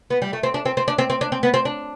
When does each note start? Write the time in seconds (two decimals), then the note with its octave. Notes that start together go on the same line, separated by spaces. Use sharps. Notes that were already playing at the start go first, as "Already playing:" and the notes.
0.10 B3
0.22 G3
0.33 A3
0.43 C4
0.54 D4
0.65 C4
0.77 C4
0.88 D4
0.98 C4
1.10 C4
1.21 D4
1.32 C4
1.43 B3
1.54 C4
1.65 D4